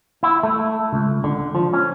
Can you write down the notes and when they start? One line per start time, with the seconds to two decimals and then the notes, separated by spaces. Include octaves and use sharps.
0.23 E4
0.43 A3
0.93 C#2
1.24 D3
1.55 F3
1.73 C#4